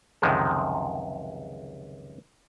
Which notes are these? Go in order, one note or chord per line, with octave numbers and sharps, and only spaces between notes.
C#2 F#2 C3 D#3 F3 G#3